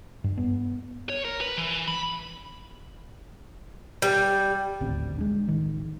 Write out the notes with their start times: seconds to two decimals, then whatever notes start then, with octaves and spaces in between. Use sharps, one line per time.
0.24 G2
0.37 B3
1.09 C#5
1.25 A#4
1.41 B4
1.58 E3
1.88 B5
4.02 G3
4.80 D#1 A1 D2 C4
5.18 G#3 D4
5.48 A1 D#3